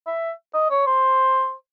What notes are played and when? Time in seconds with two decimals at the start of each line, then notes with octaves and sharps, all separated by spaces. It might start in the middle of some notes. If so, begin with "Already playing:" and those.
0.07 E5
0.54 D#5
0.70 C#5
0.87 C5